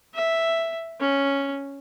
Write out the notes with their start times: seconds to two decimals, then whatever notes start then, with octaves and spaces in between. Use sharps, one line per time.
0.14 E5
1.00 C#4